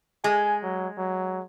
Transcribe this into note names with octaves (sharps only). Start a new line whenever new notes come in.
G#3 G#5
F#3
F#3